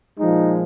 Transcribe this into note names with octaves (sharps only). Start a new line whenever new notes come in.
A#2 F3 G#3 D#4